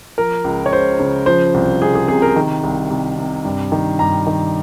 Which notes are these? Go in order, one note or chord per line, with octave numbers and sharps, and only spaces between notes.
F3 A#4
C#2
C#5
C#2 C5
C#3
F3 C5
C2
C2 G#4
G#4
C3 G#4
A#4
D#3
C2
C2
C3
G2
D#3
G2 A#5
D#3